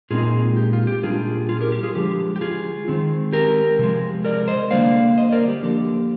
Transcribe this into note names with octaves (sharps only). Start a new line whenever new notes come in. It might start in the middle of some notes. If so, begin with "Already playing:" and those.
A#2 G#3 C4 D#4 F4 G#4
G4
F4
G4
A#2 G3 D4 F4 G#4
F4 G#4
G4 A#4
G4
F4 G#4
D3 F3 G#3 G4
G4
F4 G#4
D#3 G#3 C4
G4 A#4
C3 F3 G#3
A#4 D5
C5 D#5
D3 G3 A#3 D5 F5
C5 D#5
A#4 D5
G4
D3 F3 A#3 G4